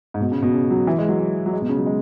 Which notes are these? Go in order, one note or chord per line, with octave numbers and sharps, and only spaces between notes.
G#2
B2
C#3
B2
C#3
F#3
E3
G#3
F#3
F#3
F#3
G#3
B2
C#3
F#3
G#3